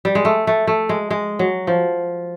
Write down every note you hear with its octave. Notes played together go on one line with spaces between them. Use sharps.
G3
G#3
A3
A3
A3
G#3
G#3
F#3
F3